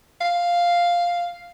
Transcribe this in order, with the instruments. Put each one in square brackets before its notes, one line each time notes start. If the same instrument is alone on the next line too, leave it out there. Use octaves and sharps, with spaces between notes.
[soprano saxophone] F5